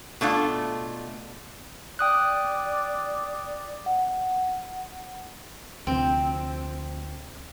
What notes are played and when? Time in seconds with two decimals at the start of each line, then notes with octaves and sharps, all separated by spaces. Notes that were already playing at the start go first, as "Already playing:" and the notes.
0.21 B2 A3 D4 F4
1.99 D5 G5 D#6 F#6
3.86 F#5
5.87 D2 C3 F3 C4